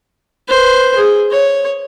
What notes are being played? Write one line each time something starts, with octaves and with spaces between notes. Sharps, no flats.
B4 C5
G#4
C#5